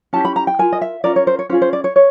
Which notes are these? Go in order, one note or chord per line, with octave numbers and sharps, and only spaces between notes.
C#4 E4 G4 A5
B5
A#5
G5
F4 A#4 G#5
D#5
E5
C#4 F4 A#4 D5
C#5
C5
C#5
C#4 F4 G#4 C5
C5
D5
C#5
C#5